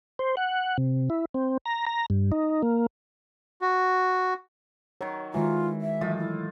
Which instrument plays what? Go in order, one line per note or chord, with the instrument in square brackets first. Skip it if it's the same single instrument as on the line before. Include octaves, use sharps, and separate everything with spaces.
[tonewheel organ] C5
F#5
C3
E4
C4
A#5
A#5
G2
D#4
A#3
[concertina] F#4
[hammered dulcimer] D#3 F#3 [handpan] C#5
[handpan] D#3 G#3 F#4 [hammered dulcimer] E3 [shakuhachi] F4
[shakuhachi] E5
[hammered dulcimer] A2 F4 D#5 [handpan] E3 F#3
[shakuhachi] E4